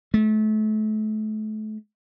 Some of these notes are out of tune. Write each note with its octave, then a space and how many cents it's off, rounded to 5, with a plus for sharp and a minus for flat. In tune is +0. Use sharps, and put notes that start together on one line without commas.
A3 -35